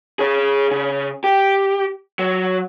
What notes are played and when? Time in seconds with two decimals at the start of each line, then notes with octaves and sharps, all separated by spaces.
0.19 G#4 C#5
0.71 C#3
1.24 G4
2.19 F#3